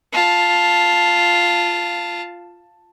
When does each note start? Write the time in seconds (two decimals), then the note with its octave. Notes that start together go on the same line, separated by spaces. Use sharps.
0.13 F4 A5